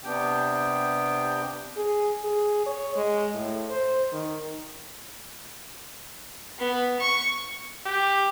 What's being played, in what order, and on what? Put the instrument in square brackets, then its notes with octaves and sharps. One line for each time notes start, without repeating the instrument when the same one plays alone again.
[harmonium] C3 B3 D4 G4 G5
[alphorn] G#4
G#4
C#5
G#3
A2
C5
D#3
[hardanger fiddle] B3
C#6
[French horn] G4